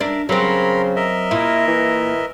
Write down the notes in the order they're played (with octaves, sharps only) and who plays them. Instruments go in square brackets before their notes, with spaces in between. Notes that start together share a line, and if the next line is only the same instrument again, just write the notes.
[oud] D4 [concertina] A#4 E5
[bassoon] C#3 [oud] F#3 C4 [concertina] A#4 B5 C6
[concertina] A#4 D#5 E5
[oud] A#2 [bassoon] E4
[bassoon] E3